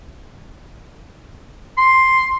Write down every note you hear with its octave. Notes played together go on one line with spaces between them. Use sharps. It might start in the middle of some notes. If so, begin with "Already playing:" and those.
C6